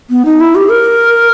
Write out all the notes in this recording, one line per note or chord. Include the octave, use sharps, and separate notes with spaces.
B3
D#4
E4
G4
A#4